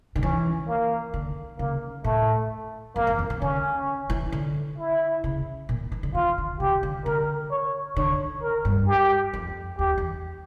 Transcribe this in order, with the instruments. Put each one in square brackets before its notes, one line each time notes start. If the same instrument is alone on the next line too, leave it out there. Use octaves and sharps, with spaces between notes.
[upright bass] D3
[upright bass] E3 [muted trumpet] C#4
[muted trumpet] A#3
[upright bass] D3
[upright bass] C#3 [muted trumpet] A#3
[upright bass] A2 [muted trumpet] A3
[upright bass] F2 [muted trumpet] A#3
[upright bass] E2
F2
E3
[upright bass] D3 [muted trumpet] C#4
[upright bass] E3
D3
[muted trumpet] E4
[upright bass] C#3
A#2
E3
D3
[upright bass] E3 [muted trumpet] F4
[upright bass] D3
[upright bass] C#3 [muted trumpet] G4
[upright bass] D3
[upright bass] D3 [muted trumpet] A#4
[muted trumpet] C#5
[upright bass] D3 [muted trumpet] C#5
[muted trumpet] A#4
[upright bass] G2
[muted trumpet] G4
[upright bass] F2
[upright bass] E2 [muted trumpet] G4
[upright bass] E2